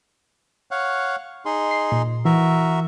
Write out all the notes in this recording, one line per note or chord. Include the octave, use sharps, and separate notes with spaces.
C#5 F5 F#5
D#4 G#4 C6
C7
A#2
E3 F#4 A#4 E5